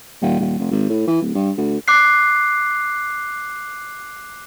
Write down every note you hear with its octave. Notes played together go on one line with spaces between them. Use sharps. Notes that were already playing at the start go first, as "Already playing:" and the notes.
D#1
D#1
F1
G#1
A2
E3
D1
G2
D2
D6 F#6 C7